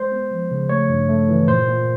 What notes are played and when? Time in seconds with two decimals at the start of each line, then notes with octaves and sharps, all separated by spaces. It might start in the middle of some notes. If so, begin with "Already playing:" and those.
Already playing: G#3 C5
0.12 B3
0.31 F3
0.51 C#3
0.69 A3 C#5
0.89 G2
1.09 A3
1.29 E3
1.48 A#2 C5
1.68 A#2